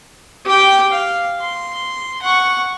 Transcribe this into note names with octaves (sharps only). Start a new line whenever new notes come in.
G4 G5
F5
C6
F#5 C#6